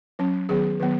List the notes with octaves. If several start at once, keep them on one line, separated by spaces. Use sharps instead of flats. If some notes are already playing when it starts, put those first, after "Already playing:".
F#3 C#4
D#3 F#3 B3 G#4
D#3 F#3 B3